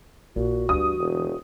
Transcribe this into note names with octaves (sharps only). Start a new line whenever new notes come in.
A#1 A#2 F#4
D2 G2 E3 D#6
E1